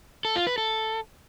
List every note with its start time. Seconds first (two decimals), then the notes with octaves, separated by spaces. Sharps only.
0.25 A4
0.36 F4
0.47 B4
0.58 A4